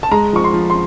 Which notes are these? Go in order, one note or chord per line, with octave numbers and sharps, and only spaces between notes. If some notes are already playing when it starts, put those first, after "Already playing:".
A5
G#3 A#5
F3 C#6
C6
F3
C6